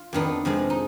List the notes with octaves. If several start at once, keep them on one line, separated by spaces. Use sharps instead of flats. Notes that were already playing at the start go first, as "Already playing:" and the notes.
Already playing: F4
F2 D#3 B3 D4 D#4
F2 C3 F3 G#3
D#4